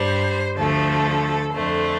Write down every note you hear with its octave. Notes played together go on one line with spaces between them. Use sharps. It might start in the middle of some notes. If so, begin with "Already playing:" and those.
Already playing: G2 G3 C5
D2 D3 F3 A3 A4
F2 D3 A3 C5